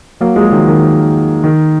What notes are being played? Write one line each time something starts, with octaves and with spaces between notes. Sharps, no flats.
F#3 A#3
F3 G#3
D#3 F#3
D#3
D#3